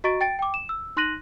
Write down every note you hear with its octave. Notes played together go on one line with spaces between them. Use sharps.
F#4 D#5 A#5 C#6 A6 D7
G5 A6 D7
G5 D6
E7
E6
D#4 C6 F#6 A#6 D#7 F#7